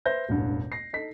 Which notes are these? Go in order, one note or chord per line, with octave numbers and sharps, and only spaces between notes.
B4 C5 E5 G6 A#6
E1 A1 G2
A#6 C7
D#4 A4 B6